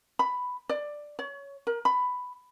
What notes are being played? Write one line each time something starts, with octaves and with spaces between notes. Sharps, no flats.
B5
D5
C#5
A#4
B5